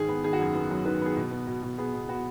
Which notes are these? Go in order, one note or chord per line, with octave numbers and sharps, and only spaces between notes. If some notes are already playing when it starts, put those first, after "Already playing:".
Already playing: G#2 D#3 G#4
B3
D#3 G#4
F#4
F#2 G#4
B3
F#3
D#3 B4
B3 G#4
B2
B3
B2
B2
B3 G#4
B2
B3 F#4